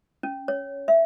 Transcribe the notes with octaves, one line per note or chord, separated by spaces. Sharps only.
C#4
C#5
E5